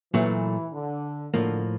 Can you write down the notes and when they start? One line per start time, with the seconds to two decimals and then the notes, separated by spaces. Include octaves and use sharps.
0.14 A#2 E3 F#3 A3
0.73 D3
1.34 A2 D3 F3 A#3